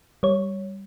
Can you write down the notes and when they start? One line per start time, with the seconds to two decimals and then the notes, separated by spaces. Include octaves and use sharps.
0.23 G3 C#5